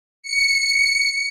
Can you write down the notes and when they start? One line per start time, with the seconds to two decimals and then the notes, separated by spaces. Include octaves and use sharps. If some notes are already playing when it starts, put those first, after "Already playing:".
0.23 C#7